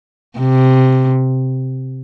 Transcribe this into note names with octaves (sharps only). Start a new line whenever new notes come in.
C3